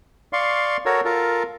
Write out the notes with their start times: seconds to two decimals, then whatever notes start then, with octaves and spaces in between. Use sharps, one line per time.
0.33 D5 F5 C6 C#6
0.86 F#4 A4 A#4 C#5
1.05 F4 A4 A#4